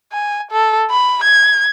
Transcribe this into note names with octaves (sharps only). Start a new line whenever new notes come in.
G#5
A4
B5
G#6